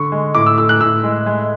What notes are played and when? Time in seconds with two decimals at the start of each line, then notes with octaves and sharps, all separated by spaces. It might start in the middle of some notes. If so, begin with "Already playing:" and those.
Already playing: D3 C#6
0.12 G#3
0.35 A2 D6
0.46 E6
0.58 A2 E6
0.69 F#6
0.80 A2 E6
1.03 G#3
1.26 G#3